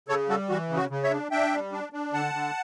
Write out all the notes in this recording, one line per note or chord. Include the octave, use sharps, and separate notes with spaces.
C#3 A4 C#5
G3 F#4 A4
E3 F#4
C#3
F#4
C#3
C#5 E5
D4
D4 E5 G5
G3
D4
D4
D3 F#5 A5
D3